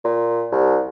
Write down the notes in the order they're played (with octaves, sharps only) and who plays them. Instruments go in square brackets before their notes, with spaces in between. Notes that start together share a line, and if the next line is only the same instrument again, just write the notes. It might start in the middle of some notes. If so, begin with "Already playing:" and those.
[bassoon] A#2
C2